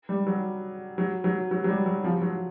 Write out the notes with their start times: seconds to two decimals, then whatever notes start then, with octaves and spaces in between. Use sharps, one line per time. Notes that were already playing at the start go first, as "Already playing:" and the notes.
0.09 G3
0.27 F#3
0.98 F#3
1.24 F#3
1.51 F#3
1.64 F#3
1.69 G3
1.86 F#3
2.04 F3
2.22 F#3